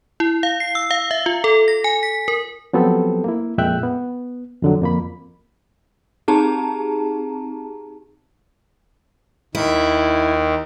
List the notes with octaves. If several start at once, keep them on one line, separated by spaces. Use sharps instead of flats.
E4
F5
C7
E6
F5
E5
F4
A4
A#6
G#5
B6
A#4
F3 F#3 B3 C4 G4 A4
A#3 E4
F2 A#2 G#3 E5 G5 F#6
B3
F2 D3 F#3
F2 A#3 B5
C4 D#4 G4 G#4 A5 A#5
D#2 D#3 E4